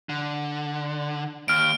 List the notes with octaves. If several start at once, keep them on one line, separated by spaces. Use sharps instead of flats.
D3
D#2 F6 D7